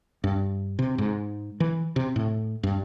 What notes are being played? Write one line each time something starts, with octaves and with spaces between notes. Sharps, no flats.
G2
C3
G#2
E3
C3
A2
G2